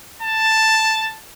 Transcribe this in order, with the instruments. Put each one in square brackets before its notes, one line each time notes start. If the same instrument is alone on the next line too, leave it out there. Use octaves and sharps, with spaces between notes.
[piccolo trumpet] A5